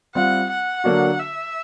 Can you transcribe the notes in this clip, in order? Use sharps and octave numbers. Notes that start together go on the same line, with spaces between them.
G3 C4 F4 F#5
F#5
D3 F#3 A#3 D4 F#4
E5